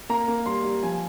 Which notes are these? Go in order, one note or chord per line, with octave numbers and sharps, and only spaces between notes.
A#3 A#5
A#3
G3 C6
G3
F3 G#5